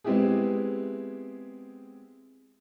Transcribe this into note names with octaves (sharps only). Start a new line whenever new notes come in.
G#3 B3 C4 E4 G4 G#4